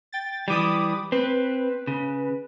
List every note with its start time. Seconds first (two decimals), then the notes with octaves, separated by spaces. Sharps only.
0.13 G5 A6
0.48 E3 G3 B5 D6 D#6
1.12 C4 B4
1.87 C#3